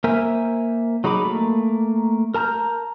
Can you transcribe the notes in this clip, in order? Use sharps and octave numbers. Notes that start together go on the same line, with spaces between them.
A#3 A#4 C5 E5 G#5
F#3 D#4 G#4 B5 D6
A3 A#3
A#4 A5 A#5 F6 G6